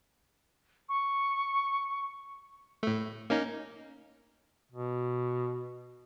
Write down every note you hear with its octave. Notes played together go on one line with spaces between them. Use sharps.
C#6
A2 A3
A#3 C#4 D#4
B2